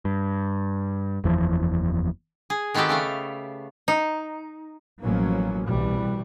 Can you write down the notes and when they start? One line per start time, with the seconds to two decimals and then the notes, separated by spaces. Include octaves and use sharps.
0.05 G2
1.24 F#1 E2 E3 F3
2.50 G#4
2.74 D#3 B3 C4 F#4 G4 A4
2.89 C#3 A3 F5
3.88 D#4
5.01 A1 B2 F3 F#3 A#3 C#4
5.66 C2 B2 E3 G3